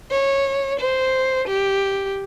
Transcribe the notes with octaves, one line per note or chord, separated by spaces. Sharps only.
C#5
C5
G4